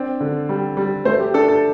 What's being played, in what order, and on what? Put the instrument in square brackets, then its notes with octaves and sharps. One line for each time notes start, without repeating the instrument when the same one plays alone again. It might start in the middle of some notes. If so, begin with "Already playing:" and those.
Already playing: [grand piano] C4 D4
D3
G3
G3
A3 C5
G4
D4 A4
A4